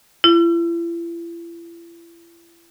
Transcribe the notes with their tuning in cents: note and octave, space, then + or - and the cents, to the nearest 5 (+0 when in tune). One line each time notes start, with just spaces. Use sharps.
E4 +40